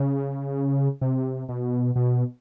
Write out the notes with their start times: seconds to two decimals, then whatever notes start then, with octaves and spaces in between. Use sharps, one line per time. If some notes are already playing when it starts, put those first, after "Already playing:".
Already playing: C#3
1.01 C3
1.49 B2
1.96 B2